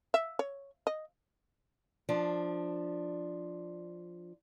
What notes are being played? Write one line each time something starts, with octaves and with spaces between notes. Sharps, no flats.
E5
C#5
D#5
F3 D4